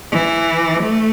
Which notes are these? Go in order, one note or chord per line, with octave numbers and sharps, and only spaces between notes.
E3
A3